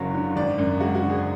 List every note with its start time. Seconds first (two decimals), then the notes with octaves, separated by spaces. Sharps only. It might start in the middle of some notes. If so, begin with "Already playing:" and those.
Already playing: F#1 F#2 F#3
0.14 D3
0.36 G#1 D5
0.58 F#2
0.80 G#3 F#4
0.95 F#4
1.02 D3
1.10 G#4